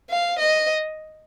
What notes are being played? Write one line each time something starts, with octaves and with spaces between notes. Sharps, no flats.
F5
D#5